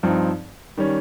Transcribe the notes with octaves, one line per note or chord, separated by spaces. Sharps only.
G2 F3 C4 D#4
D#3 G3 C#4